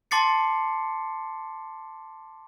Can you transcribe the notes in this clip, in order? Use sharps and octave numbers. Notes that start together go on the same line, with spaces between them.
A5 C6 D6 A6 C7 C#7